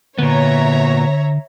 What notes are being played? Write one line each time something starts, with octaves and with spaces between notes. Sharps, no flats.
A#2 D3 B3 C#5 E5 A#5